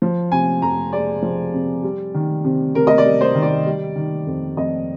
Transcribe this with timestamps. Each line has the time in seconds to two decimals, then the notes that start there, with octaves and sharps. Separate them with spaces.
0.02 F3
0.32 C3 G#5
0.62 F2 A#5
0.93 G#3 D5
1.22 F3
1.54 C3
1.83 G3
2.14 D#3
2.44 C3
2.75 C3 A#4
2.87 D#5
2.98 D5
3.05 G3
3.21 C5
3.35 D#3
3.43 D5
3.65 G3
3.96 D#3
4.26 F2
4.57 F2 D#5